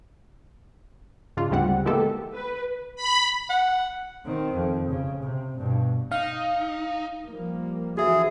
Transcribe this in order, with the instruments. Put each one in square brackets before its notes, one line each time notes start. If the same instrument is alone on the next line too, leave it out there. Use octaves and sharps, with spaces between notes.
[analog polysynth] G#2 C#3 D4 F4
D2 G#2 C#3 G3 C4 F#5
E3 G#3 A#3 B3 G4 A4
[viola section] B4
[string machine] B5
[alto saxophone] F#5
[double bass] D#3 C4
F2
C#3
C3
G2 B2
[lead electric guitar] D#4 [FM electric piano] F5
[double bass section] F3 G3 A#3
[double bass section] D3 E3 F3 [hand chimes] F#4 E5 [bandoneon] G#4